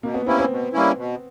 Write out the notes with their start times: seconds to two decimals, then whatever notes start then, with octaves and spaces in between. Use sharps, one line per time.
0.03 B2 A#3
0.14 B3
0.26 G3 A#3 C4 C#4 E4
0.39 C4
0.50 B2
0.73 G3 A#3 C#4 E4
0.97 B2